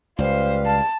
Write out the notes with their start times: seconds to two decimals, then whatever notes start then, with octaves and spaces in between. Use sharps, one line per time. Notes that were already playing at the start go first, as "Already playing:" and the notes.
0.19 C#2 G3 B4 C5 F5
0.66 A5